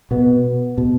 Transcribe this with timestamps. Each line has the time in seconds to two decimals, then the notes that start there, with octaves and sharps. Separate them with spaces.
0.11 B2 B3
0.78 B2